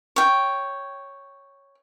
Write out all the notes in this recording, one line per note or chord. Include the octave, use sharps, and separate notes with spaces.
C#5 G5